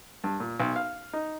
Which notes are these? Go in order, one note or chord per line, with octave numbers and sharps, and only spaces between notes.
G2
A#2
B1
F5
D#4